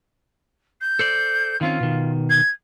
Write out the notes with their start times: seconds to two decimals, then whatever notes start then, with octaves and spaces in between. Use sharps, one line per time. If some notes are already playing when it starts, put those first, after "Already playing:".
0.80 G6
0.99 A4 C5 D5
1.61 D#3 C4 C#4 F4
1.80 B2 D#3
2.29 G#6